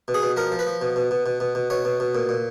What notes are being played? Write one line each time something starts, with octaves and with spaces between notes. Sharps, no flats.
B2
G#4
B2
F3 A#4
F3
B4
F3
B2
B2
B2
B2
B2
B2
B2 C#5
B2
B2
A#2
A#2